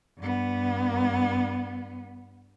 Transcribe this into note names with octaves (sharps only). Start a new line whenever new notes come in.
G2 B3